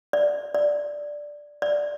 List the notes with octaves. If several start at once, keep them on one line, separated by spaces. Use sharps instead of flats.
D5
D5
D5